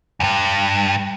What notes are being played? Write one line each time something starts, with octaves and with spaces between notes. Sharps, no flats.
E2 G2